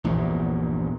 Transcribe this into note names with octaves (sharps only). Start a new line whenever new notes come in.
A#1 E2 G2 A#2